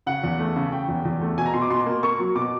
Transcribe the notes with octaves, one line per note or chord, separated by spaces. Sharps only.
C#3 F#5
E2
A3
C#3
C#3 G5
E2
E2
A3
B2 G#5
A#5
B2 C6
D6
B2 C6
A#3
A#3 C#6
F#3
B2 D6